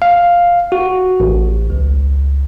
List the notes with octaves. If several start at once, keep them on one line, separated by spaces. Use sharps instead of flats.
F5
F#4
A1
C#2